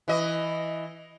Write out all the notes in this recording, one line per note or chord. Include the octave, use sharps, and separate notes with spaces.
E3 D#5